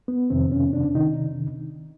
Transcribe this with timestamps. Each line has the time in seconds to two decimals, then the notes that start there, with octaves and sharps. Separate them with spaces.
0.08 B3
0.30 F2 C3 D#3 C4
0.52 C#4
0.73 D4
0.95 C3 D#3 D#4